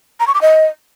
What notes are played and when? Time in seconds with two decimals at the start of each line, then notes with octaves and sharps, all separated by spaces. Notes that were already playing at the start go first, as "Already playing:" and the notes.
0.20 A#5
0.27 C#6
0.34 D6
0.42 D#5